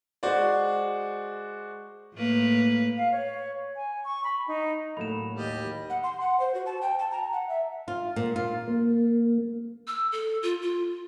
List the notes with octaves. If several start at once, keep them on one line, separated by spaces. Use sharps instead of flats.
G#3 F#4 C5 D5
A2 A#3 B4
F5
C#5
G#5
C#6
B5
D#4
A2 F#3 A3 A#3 B5 E7
D#2 G3 D#5
F#5
C6
F#5
C5
F#4
A5
G5
A5
A#5
F#5
E5
F4
A#2
F4
A#3
E6
A4
F4
F4